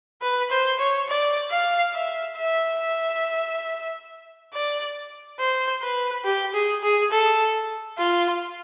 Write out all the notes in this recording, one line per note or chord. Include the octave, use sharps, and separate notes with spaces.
B4
C5
C#5
D5
F5
E5
E5
D5
C5
B4
G4
G#4
G#4
A4
F4